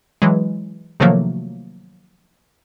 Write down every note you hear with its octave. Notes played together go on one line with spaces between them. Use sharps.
E3 F#3 G#3
C3 D#3 F3 F#3 A3 A#3